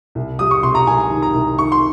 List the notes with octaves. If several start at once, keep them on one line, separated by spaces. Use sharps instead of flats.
C2
G3 D#6
C#6
C3 C6
A#5
C2 G#5
D#3
A#5
C2
D#3 C#6
C6